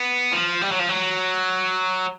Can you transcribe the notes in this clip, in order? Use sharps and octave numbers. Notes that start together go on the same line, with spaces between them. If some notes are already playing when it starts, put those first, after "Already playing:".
Already playing: B3
F3
G3
F#3
F3
F#3